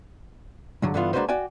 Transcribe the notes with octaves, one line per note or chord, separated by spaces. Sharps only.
C#2 G2 D3 F#3
G2 D3 E3 B3 C#4 F4
G#3 A#3 D4 F#4 B4 C5
F#4 D5 G5 G#5